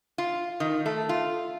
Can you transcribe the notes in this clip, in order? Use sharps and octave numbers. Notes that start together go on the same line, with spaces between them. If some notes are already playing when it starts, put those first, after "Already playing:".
F4
D#3
A3
F4